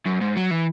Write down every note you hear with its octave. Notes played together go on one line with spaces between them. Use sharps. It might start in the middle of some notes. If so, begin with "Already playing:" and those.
F#2
G#2
F#3
E3